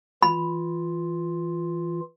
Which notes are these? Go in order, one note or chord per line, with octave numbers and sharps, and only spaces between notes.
E3 F4 B5